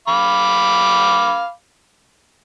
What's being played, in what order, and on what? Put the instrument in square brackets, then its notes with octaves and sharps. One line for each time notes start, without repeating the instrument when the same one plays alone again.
[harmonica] F5 B5 D6